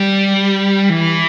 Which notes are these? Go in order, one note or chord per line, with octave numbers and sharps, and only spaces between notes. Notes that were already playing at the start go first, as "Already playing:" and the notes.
Already playing: G3
E3